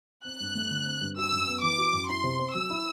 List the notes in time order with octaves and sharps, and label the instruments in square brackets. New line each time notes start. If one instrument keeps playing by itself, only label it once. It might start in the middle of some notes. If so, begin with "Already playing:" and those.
[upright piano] C4 [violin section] F#6
[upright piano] G2
A3
D3
C4
G2
[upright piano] F#4 [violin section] E6
[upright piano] F#2
B3
[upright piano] E3 [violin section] D6
[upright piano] F#4
F#2
[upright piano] E4 [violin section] C6
[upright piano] C3
C4
[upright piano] F#3 [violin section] E6
[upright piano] E4